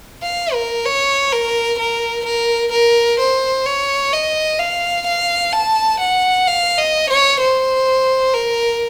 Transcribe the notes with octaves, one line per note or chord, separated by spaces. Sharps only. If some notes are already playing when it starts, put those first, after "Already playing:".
F5
A#4
C#5
A#4
A#4
A#4
A#4
C5
C#5
D#5
F5
F5
A5
F#5
F5
D#5
C#5
C5
A#4